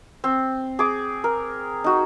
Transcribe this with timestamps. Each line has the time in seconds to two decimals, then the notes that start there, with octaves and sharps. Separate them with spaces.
0.24 C4
0.79 G#4 D6
1.24 A#4
1.84 D#4 F#4